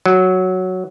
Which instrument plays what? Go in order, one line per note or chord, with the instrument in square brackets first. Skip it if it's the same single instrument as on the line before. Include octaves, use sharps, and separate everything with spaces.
[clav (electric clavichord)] F#3